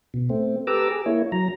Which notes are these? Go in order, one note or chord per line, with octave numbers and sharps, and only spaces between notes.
B2
A3 C4
G4 A4 B4 A#5 D6 E6
G#4
A#3 E4 C#5
F#3 A#5